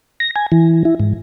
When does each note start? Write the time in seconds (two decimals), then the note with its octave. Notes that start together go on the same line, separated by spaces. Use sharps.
0.20 A#6
0.36 G#5
0.52 E3
0.85 E4
0.99 G#2